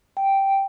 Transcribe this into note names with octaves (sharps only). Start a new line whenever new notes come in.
G5